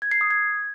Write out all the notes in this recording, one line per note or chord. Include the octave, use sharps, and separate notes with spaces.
G#6
C7
D#6
G#6